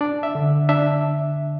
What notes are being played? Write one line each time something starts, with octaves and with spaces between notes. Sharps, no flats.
D4 D5
E5
D3
D4 E5